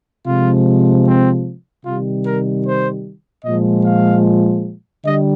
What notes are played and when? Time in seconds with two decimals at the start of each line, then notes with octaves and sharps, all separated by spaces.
0.25 C3 F3 G#3 F4
1.05 C4
1.84 C3 D#3 G3 F4
2.25 A#4
2.65 C5
3.44 A#2 F3 G#3 D#5
3.85 F5
5.05 D3 G3 D#5